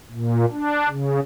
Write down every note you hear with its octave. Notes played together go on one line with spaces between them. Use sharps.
A#2
D4
C#3